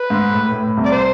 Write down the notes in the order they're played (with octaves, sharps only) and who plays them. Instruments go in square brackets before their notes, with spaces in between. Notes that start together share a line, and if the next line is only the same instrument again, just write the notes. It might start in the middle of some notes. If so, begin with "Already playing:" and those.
Already playing: [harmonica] B4
[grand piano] G#2
A2
A2
A2
C2 C3
[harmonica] D5
C5